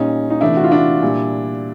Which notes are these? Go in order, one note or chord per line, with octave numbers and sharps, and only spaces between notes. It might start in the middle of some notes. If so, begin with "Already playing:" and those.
Already playing: A#2 G3 C#4 D#4
D#4
C3 E3 A3 D4 E4
F#4
F4
D4 E4
A#2 G3